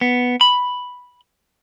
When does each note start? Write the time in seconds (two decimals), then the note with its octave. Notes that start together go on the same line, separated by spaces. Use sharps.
0.01 B3
0.41 B5